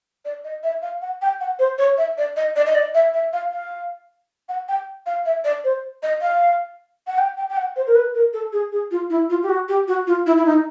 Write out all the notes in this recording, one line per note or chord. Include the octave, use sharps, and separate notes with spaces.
D5
D#5
E5
F5
F#5
G5
F#5
C5
C#5
E5
D5
D#5
D5
D#5
D5
E5
E5
F5
F5
F#5
G5
F5
E5
D5
C5
D#5
F5
F#5
G5
G5
G5
F#5
C5
A#4
B4
A#4
A4
G#4
G#4
F4
E4
F4
G4
F#4
G4
F#4
F4
E4
E4
D#4